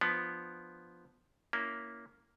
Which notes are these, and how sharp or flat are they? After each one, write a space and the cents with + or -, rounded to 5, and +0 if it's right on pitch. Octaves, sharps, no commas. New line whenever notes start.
F3 +0 B3 +0 D4 +20
A#3 +0 C#4 +20 E4 +0